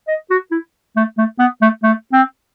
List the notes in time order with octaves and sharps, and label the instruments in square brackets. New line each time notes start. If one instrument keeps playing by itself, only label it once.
[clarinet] D#5
F#4
E4
A3
A3
B3
A3
A3
C4